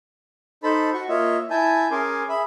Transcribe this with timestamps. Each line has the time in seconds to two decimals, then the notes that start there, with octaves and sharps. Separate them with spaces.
0.63 D#4 A4 C5 A5 B5
0.93 F#4 C#6
1.09 A#3 F4 C#5 D#5 E5
1.50 E4 G#5 A5 G6
1.91 C#4 G#4 A#4 G#5 C6 D6
2.29 G#4 E5 B5